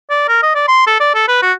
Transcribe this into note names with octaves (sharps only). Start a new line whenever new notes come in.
D5
A#4
D#5
D5
C6
A4
D5
A4
B4
F#4